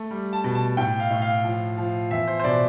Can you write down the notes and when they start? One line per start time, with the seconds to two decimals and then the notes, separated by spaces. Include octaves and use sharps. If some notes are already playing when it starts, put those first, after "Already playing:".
Already playing: A3
0.11 G3
0.33 A5
0.44 B2
0.55 A5
0.77 A2 G5
1.00 F5
1.10 A2
1.22 F5
1.44 F3
1.78 F3
2.11 E2 E5
2.27 C5
2.39 C5
2.44 B2 D5